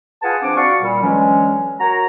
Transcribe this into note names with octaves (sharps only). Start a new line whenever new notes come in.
F4 G#4 B4 F#5 G#5 A5
F3 C4 D4 D6
F#4 D5 F5 C#6
A#2 G3
D3 E3 F#3 G#3 C#4
F#4 A#4 C#5 A#5